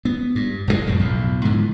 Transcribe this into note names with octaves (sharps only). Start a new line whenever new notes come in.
B3
G2
F1 D#2 A2 G#3
F1 F#2 A2 C#3
B1 F2 A2
G#2 D3 E3 F3